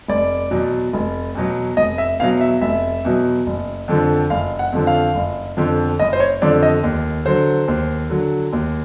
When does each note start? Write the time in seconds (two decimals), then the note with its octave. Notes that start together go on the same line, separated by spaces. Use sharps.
0.08 F1 D5
0.51 E2 B2 F#3
0.93 F1
1.35 E2 B2 F#3
1.77 F1 D#5
1.98 E5
2.19 E2 B2 F#3 F5
2.41 E5
2.62 F1 E5
3.05 E2 B2 F#3
3.46 F#1
3.88 F2 D3 F3
4.30 F#1 F5
4.59 F#5
4.72 F2 D3 F3
4.87 F5
5.15 F#1
5.57 F2 D3 F3
5.99 F#1 D#5
6.13 C5
6.20 C#5
6.42 F2 D3 F3 D5
6.63 D#5
6.83 D#2
7.25 D3 F#3 C5
7.68 D#2
8.10 D3 F#3
8.53 D#2